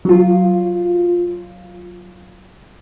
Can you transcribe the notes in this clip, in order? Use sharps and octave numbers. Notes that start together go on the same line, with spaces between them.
F#3 F4